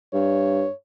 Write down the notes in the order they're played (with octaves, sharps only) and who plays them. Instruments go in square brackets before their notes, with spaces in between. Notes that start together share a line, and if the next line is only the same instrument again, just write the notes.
[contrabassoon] G2 [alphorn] C#5